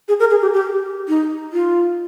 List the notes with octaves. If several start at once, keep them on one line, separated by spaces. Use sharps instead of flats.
G#4
A#4
G#4
G4
G4
D#4
F4